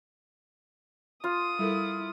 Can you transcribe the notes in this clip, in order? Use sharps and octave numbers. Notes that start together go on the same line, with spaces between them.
F4 D#6
G3 E4 A4 A#4